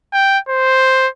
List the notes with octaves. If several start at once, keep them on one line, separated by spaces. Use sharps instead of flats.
G5
C5